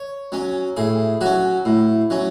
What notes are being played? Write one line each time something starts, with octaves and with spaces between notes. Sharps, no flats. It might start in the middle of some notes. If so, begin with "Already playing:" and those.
Already playing: C#5
F#3 C#4
A2 G#4
F#3 C#4 F#4
A2
F#3 C#4